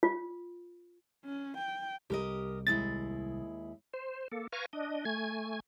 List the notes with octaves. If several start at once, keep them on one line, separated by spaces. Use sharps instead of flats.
F4
C#4
G5
C2 G4 A#4 D#5
D#2 G#3 E4 A6
C5
A#3 A4
B4 F5 G#5 A#5 C#6
D4 D#5
A3 G#5 G#6